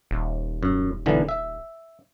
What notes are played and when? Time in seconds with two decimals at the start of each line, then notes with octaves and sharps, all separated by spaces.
0.11 D#1
0.63 F#2
1.06 B1 D3 E3
1.29 E5